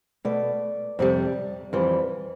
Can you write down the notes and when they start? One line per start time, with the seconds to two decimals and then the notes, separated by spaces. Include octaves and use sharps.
0.25 B2 A3 D5
0.99 F2 C3 G3
1.73 F2 E3 G3